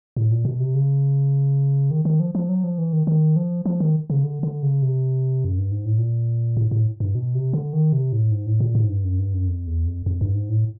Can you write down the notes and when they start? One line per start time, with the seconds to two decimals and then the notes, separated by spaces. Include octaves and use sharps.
0.17 A2
0.31 A#2
0.45 B2
0.60 C3
0.75 C#3
1.91 D#3
2.05 D#3
2.20 F3
2.35 F3
2.49 F#3
2.64 F3
2.78 E3
2.93 D#3
3.07 D#3
3.36 F3
3.66 F3
3.80 D#3
4.10 C#3
4.24 D3
4.43 D3
4.63 C#3
4.82 C3
5.45 F#2
5.58 G2
5.71 G#2
5.85 A2
5.98 A#2
6.57 A2
6.71 A2
7.00 G2
7.15 B2
7.35 C3
7.53 D3
7.73 D#3
7.93 C3
8.12 A2
8.32 G#2
8.46 A2
8.60 A#2
8.75 A2
8.84 G#2
8.90 G2
9.04 F#2
9.19 G2
9.34 F#2
9.48 F2
9.67 E2
9.86 F2
10.06 F2
10.21 G2
10.35 G#2
10.49 A2